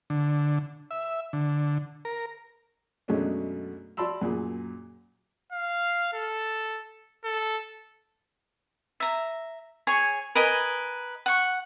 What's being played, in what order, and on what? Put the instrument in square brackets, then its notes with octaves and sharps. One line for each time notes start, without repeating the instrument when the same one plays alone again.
[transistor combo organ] D3
E5
D3
A#4
[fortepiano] F#2 B2 G#3 A3 C#4 D4
F#4 D5 A5 B5 C6 E6
F#2 A#2 G#4
[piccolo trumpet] F5
A4
A4
[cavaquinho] E5 A#5
G#4 C#5 G#5 C#6
A#4 B4 D#5 G#5
F#5 C#6